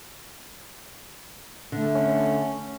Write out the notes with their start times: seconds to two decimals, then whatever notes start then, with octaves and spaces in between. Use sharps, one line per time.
1.72 D3 A3
1.95 C#4